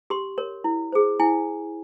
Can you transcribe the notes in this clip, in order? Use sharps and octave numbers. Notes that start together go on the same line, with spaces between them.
G4 C6
A#4 C#5
E4
G#4 C5
E4 G#5